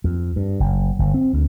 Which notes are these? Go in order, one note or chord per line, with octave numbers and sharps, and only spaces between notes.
F2
G2
F#1
G1
C4
D2